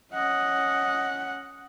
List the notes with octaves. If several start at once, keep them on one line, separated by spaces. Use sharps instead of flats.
C#4 D#5 F#5